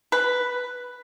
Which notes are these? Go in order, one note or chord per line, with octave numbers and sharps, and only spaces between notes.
B4